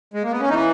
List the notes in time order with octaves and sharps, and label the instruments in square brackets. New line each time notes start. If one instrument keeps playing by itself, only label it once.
[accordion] G#3
A#3
B3
C#4
E3 D#4